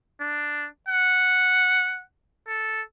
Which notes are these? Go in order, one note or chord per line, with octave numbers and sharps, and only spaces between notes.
D4
F#5
A4